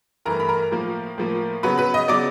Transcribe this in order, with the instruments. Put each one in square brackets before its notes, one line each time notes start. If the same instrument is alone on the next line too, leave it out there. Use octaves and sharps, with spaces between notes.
[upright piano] G2 E3 A3 A#4 A#5
B5
A#4 A#5
A2 F3 A#3
A2 F3 A#3
C#3 F#3 B3 B4 B5
B4 B5
D#5 D#6
C#3 F#3 B3 D5 D6